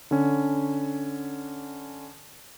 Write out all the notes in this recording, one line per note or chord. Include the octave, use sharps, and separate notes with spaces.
D3 C#4